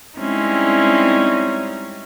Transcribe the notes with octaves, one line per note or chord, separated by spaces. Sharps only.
G3 G#3 C4 C#4 D#4 E4